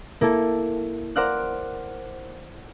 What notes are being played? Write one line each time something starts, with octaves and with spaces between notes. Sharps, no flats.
A#3 E4 A4
A#4 C5 D5 F#5 F6 F#6